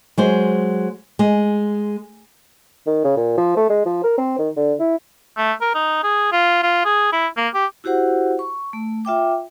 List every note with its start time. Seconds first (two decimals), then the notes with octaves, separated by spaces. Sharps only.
0.17 F#3 G#3 C5
1.19 G#3
2.86 D#3
3.04 C#3
3.17 A#2
3.38 F3
3.57 A3
3.69 G#3
3.86 F3
4.04 A#4
4.18 C4
4.39 D#3
4.56 D3
4.79 E4
5.37 A3
5.61 A#4
5.75 D#4
6.03 G#4
6.32 F4
6.63 F4
6.85 G#4
7.12 E4
7.37 A#3
7.54 G4
7.84 E4 F#4 G4 C5 F#5
8.39 C#6
8.73 A3
9.05 F4 E5 G5 D6